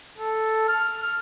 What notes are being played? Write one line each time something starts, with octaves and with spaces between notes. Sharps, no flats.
A4
F6